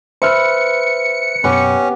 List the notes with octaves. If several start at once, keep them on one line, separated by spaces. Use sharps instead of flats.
B4 C5 E5 B5 F6 C#7
F#2 B2 B3 C#4 G4 B4